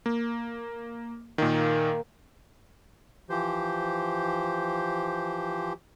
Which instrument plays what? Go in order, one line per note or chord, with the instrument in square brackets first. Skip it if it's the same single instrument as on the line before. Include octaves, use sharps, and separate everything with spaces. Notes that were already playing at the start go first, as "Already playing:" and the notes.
[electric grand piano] A#3
[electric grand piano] A#2 D#3 [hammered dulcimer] A#3 A#4
[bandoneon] E3 F3 G4 C5